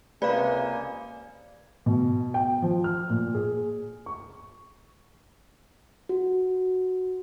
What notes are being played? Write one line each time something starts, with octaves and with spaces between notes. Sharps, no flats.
C#2 C3 A#3 B4 D5 F5 G#5
B2
G5
F3
F6
A#2
G#4
C#6
F#4